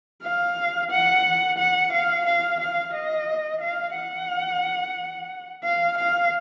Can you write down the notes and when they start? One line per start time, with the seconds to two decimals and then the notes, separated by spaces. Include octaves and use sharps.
0.22 F5
0.90 F#5
1.58 F#5
1.92 F5
2.25 F5
2.60 F5
2.93 D#5
3.61 F5
3.95 F#5
5.64 F5
5.98 F5